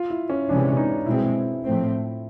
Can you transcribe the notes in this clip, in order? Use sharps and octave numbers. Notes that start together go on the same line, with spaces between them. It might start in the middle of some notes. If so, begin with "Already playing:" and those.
Already playing: F4
E4
C#4
C3 E3 G#3 C#4 D4
D#4
B2 G#3 C4 E4
A2 F3 A3 C4